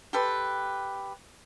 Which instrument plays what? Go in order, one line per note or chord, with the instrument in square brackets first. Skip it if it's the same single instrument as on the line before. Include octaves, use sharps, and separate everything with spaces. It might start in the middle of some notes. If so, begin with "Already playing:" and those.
[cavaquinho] G4 A4 B4 C6